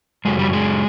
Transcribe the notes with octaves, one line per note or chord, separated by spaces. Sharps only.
F#2 C#3 F#3 G#3
G3
G#3